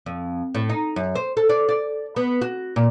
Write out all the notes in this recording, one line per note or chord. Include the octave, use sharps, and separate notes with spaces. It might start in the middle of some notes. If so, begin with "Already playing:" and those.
F2
A2
D#4
F#2
C5
A4
D5
D5
B3
F#4
A#2